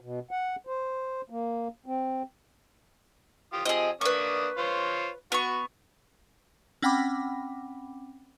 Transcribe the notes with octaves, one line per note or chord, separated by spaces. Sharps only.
B2
F#5
C5
A#3
C4
F4 G4 D#6
F3 C4 G4 G#4 D#5
A#3 D4 B4 C#6 D#6
F4 C5 C#5
B3 F#4 C#6
C4 C#4 F#5 G5 B5 D6